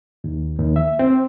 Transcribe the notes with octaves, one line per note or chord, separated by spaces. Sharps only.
D#2
D#2
E5
C4